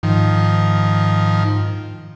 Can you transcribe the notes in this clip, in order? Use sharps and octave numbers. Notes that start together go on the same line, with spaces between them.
G#2 D#3 F3